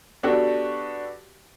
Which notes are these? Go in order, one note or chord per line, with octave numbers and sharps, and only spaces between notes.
B3 D4 F#4 G4 A4 B4